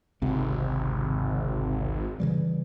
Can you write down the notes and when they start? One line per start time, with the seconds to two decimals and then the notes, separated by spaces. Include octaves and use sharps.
0.22 G#1 C#2 C3
2.20 C#3 E3 G3